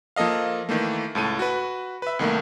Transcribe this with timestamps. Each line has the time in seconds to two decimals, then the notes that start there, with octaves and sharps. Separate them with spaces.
0.16 F3 A#3 A4 D#5 F5
0.69 D#3 E3 A3 A#3
1.15 C#2 A2 A4 D#7
1.39 F#4 B4
2.02 B4 E5
2.19 C2 D#3 A3 A#3